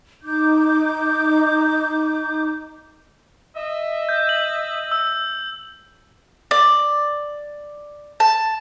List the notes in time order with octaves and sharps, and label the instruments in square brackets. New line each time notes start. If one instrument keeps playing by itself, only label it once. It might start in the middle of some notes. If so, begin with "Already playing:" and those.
[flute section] D#4 D6 G6
[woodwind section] D#5 E5
[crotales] G6
F#7
E6
[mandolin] D5
A5